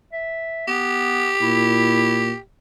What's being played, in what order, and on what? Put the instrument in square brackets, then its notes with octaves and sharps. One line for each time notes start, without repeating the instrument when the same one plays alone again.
[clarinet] E5
[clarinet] B3 [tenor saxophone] G4
[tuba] A#2 [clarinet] E4